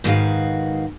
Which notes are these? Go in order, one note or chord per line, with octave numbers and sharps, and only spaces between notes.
G#2 D#3 F#4 G#4 B4 F5